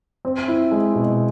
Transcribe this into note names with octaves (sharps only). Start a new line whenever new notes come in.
C4
E4
G#3
B2